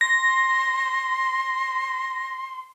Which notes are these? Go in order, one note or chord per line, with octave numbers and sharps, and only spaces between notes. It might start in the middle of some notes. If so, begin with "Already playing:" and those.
C6 A#6